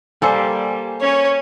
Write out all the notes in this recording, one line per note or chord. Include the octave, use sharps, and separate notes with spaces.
G3 A#3 A4 C5 G#5
C#4 C#5